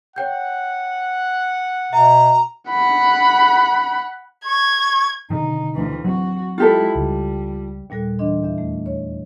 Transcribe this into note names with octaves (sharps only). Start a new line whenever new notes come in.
C#5 F#5 G5 G6
B2 E5 A#5
F#5 B5
C#6 G#6
B2 D3 D#3 D#4
D2 E3
F#3 C4 F#4
G#3 E4 F4 G4 A4
C#2 G3
D#2 A#2 G3 A4 F#6
E3 D4 D#5 C6
E2 E5
A3
C#5